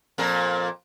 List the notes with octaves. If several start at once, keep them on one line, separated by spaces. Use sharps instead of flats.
F2 A#2 A#4